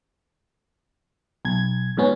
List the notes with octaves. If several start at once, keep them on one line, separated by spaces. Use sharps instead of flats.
B1 G#6
F2 G#2 B2 B3 C#4